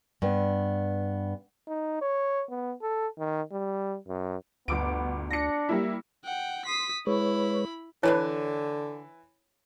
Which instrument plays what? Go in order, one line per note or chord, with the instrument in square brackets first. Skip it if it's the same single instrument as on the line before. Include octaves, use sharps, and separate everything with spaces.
[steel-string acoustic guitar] G2 B3
[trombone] D#4
C#5
B3
A4
D#3
G3
F#2
[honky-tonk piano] G1 D6 D7 [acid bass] D2 [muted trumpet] B3
[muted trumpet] D4 [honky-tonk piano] A#6 C#7
[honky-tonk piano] G3 A#3 E4
[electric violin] F#5 G5
[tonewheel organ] C6 [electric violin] D#6 B6
[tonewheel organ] G#3 B4 C#5 [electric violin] E4 B5
[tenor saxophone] D3 [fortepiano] E3 [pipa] D4 B4 A5 [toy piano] C#5